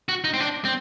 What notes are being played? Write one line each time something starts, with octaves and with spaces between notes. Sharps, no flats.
F#4
D#4
C4
D4
C4